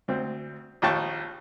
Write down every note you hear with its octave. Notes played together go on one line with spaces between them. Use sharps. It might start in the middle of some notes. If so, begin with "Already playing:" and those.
D2 C4
A#1 D#2 G5 A5 C#6